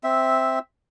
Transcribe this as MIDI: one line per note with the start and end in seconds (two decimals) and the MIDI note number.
0.04 0.59 60
0.04 0.59 76